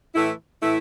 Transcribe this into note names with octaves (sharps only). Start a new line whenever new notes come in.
A2 E3 A3 E4
A2 E3 A3 E4